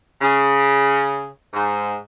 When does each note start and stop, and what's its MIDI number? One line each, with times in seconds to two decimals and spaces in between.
0.21 1.27 49
1.53 1.95 44